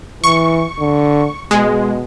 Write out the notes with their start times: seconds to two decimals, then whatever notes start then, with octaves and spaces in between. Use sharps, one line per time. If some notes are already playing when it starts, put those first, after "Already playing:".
0.24 E3 C#6
0.79 D3
1.51 B2 G#3